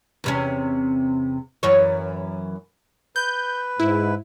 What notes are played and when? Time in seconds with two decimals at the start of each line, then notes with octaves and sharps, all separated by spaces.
0.24 E2 C3 C#4
1.63 F#2 E3 C#5
3.16 B4 G6
3.80 G#2 E4